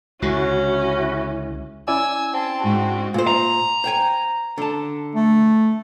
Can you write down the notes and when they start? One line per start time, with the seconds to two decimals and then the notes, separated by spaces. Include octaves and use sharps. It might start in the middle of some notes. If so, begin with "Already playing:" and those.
0.22 C#2 D3 C#4 E4 F#4
1.88 C#4 E4 D5 G#5 E6
2.33 C4 A5
2.64 G#2 F#4
3.14 A#2 C5
3.27 A#5
3.84 C5 G5 G#5
4.58 D3 A5
5.15 A3